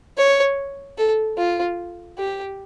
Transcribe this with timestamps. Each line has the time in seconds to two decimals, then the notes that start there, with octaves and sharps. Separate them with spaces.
0.17 C#5
0.98 A4
1.38 F4
2.18 G4